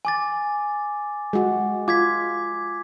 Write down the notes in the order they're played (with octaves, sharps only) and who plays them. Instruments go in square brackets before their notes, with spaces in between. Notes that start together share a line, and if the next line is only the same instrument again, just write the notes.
[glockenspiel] G#5 D6 A6
[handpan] G#3 F#4
[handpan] F4 [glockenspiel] D6 G#6 B6